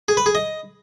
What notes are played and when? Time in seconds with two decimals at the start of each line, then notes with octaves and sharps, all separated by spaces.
0.08 G#4
0.17 B4
0.26 G#4
0.35 D#5